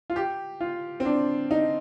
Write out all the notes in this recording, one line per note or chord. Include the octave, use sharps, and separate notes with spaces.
F4
G4
F4
C4
D4
D#4